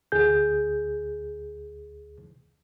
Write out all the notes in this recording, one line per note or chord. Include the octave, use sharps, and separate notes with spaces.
D2 G#4 G6